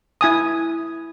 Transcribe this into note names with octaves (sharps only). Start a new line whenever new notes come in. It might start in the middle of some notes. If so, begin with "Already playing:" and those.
E4 G#5 D#6